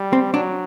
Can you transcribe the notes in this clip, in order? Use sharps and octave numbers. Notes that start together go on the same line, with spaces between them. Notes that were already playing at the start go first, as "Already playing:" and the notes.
Already playing: G3
C4
F#3 D4